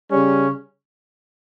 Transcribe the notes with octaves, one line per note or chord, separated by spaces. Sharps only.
C#3 G3 C#4